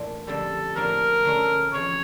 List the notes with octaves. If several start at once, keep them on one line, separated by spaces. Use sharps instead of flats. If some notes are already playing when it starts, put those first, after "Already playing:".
Already playing: A2 E3 A#3 D4 F4
F2 D3 G3 A4
A2 F3 A#3 D4 A#4
D3 A3 C#4 F4 A4
F2 C#3 E3 C#5